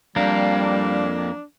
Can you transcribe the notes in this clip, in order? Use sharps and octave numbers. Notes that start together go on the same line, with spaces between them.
F2 G3 A#3 D4